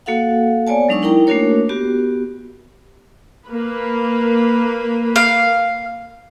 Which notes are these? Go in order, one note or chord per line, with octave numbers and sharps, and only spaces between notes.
A#3 F#4 A4 F5 F#5
B3 C#5 D5 G#5 A5
F#3 G#3 D4 D#4 C#6 E6
D#4 E4 A#4 G5 A#5
A3 A#3 D4 F#4 A#4 C#5
B3 F#4 G4
A#3 B4
F5